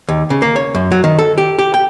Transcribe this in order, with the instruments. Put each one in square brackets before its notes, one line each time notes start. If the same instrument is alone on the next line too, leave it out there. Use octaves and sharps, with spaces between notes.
[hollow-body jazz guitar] D#2
C#3
A#3
C#5
F#2
F#3
D#3
A4
G4
G4
G5